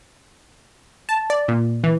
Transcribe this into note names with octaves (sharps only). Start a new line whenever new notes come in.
A5
D5
A#2
E3